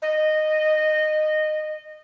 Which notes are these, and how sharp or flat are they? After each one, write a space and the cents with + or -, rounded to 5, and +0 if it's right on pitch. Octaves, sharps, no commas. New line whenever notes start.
D#5 -15